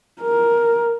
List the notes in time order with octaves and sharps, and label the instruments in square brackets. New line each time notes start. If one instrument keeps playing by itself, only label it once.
[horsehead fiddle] A#4